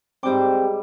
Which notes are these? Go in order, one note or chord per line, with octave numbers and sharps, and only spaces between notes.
G#2 G3 C4 G4 G5 D6